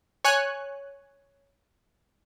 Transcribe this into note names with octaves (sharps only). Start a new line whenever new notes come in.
C#5 G#5 F#6